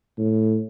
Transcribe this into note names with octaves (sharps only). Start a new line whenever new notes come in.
A2